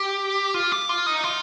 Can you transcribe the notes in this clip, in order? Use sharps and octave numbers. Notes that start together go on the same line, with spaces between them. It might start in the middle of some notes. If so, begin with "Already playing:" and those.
Already playing: G4
F4
G4
F4
D#4
F4